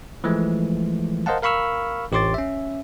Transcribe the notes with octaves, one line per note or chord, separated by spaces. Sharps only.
E3 F3 G#3 A3
A#4 C5 D#5 F5 F#5 A5
A#4 F5 B5 C#6 E6 F6
A1 G4 C#5 C6 D6 A6
C#4 E5